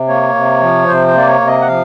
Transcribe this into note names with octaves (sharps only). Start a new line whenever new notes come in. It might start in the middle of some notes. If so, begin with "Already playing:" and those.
Already playing: C3
A#3 C#5
C3
F3
C3 C5
C5
A#3 D5
C#5
C3
D#5
F#5
F3 F5